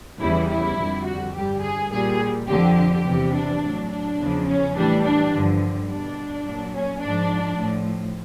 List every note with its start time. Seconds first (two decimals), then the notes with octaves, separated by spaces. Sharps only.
0.21 E2 C#3 E3 G3 E4
0.50 E4
0.77 F2 D3 G3
1.06 F#4
1.35 G2 D3 G3 G4
1.62 G#4
1.92 A#2 G3 G#4
2.48 F2 D3 F3 G4
2.77 G4
3.06 E2 C3 E3 G3
3.33 D4
3.61 A2 F#3
3.91 D4
4.18 E2 C#3 F3
4.47 C#4
4.76 A2 E3 G3 D4
5.04 D4
5.33 G2 D3 F3
5.89 B2 G3 D4
6.47 A#2 F#3
6.76 C#4
7.03 G#2 F3 D4
7.60 A2 F3